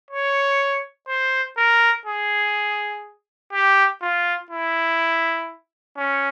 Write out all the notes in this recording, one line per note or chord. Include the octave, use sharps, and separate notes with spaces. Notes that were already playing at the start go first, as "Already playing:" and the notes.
C#5
C5
A#4
G#4
G4
F4
E4
C#4